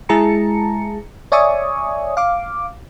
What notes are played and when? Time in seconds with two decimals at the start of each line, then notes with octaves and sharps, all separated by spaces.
0.09 G#3 E4 G#4 A5 A#5 C#7
1.32 C#5 D5 E5 G#5 C#6 D#6
2.17 F5 D6